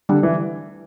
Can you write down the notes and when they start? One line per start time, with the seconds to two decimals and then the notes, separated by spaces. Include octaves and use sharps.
0.09 D3 G3
0.23 E3